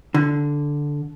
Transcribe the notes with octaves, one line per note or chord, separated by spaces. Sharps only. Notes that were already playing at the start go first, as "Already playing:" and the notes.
D3